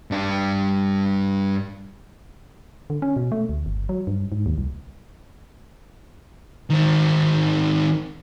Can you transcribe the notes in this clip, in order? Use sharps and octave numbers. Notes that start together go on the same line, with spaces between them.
G2 D4
D3
C#4
B2
A3
D2
G1
F#3
G2
G#2
D#2
C2
D#3 C4